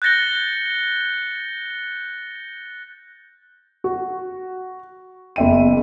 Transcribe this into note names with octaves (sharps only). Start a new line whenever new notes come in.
F#6 G6 A6 A#6 C#7 G7
F#4
F#1 E2 E5 G5 D#7